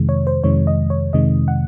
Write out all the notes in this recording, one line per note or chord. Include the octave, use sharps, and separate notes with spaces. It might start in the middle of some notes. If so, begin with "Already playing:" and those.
Already playing: F2 C3 D#3 G#3
C#5
C5
F2 C3 D#3 G#3 C#5
D#5
C#5
F2 C3 D#3 G#3 D#5
F#5